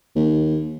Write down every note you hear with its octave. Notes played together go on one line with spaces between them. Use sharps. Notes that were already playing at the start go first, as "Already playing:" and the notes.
D#2